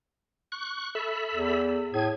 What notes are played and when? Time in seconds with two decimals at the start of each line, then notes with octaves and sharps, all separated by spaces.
0.52 C#6 F#6
0.95 A4 E5 B5
1.34 E2
1.94 A2 G#4 G#6